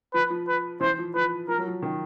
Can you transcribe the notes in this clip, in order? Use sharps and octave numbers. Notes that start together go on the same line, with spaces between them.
F3 B4
F3
B4
E3 C5
F3
F3 B4
F3 A#4
F#3
F3
D#3